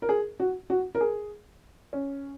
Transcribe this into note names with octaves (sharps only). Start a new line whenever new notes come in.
A#4
G#4
F#4
F#4
A#4
G#4
C#4